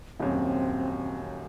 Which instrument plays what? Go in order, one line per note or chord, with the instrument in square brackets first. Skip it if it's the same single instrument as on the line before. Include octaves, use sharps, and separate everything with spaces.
[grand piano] D#1 F#2 [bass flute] C4